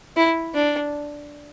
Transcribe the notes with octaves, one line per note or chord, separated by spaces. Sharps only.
E4
D4